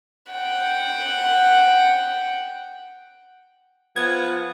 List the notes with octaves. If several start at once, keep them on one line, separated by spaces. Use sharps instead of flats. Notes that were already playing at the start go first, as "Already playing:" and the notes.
F#5 G5
F3 B3 G#6